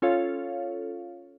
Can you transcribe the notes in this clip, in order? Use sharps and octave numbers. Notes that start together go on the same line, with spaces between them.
C#4 F4 A4 C#5 F5